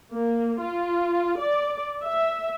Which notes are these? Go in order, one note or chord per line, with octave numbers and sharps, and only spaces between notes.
A#3
F4
D5
E5